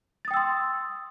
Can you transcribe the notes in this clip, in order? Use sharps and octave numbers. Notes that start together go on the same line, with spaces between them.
G5 C6 D#6 E6 A6